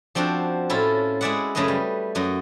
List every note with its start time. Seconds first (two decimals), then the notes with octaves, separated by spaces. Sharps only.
0.15 F3 C4 D4 F#4 C5
0.70 A2 C#4 E4 F4 A4
1.21 G#3 E4 G#4 D5 E5 F#5
1.55 F#2 C#3 A3 G#4 B4 D#5
1.68 G3
2.15 F#2 F#4 D#5